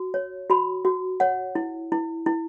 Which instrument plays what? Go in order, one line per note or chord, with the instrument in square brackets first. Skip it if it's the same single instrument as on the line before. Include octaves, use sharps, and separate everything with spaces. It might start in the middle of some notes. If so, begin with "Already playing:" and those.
Already playing: [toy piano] F#4
C#5
F#4 B5
F#4
C#5 F#5
E4
E4
E4